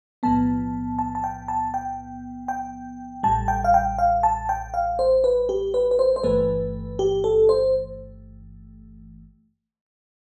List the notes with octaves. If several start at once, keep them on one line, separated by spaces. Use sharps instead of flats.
B1 A2 F3 B3 A5
A5
A5
G5
A5
G5
G5
A1 A2 G3 A5
G5
F5
G5
F5
A5
G5
F5
C5
B4
G4
B4
B4
C5
C5
G1 G2 E3 A3 B4
G4
A4
C5